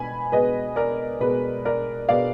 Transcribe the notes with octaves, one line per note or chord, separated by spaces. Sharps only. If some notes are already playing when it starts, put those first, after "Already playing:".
Already playing: B2 G#5 B5
B2 G#3 B3 B4 D#5
A#4 D5
B2 G#3 B3 B4
A#4 D5
B2 G#3 B3 D5 F5